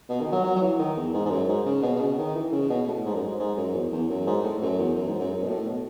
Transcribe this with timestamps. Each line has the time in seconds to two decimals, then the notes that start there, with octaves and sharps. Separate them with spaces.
0.09 B2
0.21 D#3
0.32 F#3
0.44 F#3
0.56 F#3
0.62 E3
0.79 D#3
0.96 E2
1.14 G#2
1.25 G#2
1.31 F#2
1.48 G#2
1.65 C#3
1.83 B2
1.95 B2
2.00 C#3
2.18 D#3
2.35 E3
2.52 C#3
2.70 B2
2.88 A2
3.05 G#2
3.15 F#2
3.22 G#2
3.40 G#2
3.57 F#2
3.74 E2
3.92 E2
4.10 F#2
4.27 G#2
4.44 A2
4.62 F#2
4.79 E2
4.96 F#2
5.07 G#2
5.19 F#2
5.31 F#2
5.43 B2
5.48 A2
5.66 B2